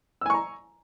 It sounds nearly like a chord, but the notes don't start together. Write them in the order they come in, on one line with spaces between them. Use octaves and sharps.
E6 G#5 C#6 A#5